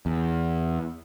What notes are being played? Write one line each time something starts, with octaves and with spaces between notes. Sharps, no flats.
E2